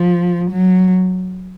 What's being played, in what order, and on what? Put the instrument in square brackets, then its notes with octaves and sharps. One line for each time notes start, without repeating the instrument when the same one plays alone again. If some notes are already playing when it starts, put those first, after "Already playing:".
Already playing: [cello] F3
F#3